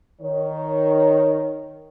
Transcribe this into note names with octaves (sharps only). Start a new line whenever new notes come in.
D#3 C#5